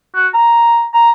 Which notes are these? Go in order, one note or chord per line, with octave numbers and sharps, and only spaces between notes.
F#4
A#5
A#5